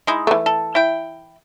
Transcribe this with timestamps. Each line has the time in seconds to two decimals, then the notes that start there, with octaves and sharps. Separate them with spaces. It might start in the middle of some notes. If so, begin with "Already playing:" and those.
0.07 G#3 D#4 E4
0.27 E3 A3
0.46 A4
0.75 E4 G5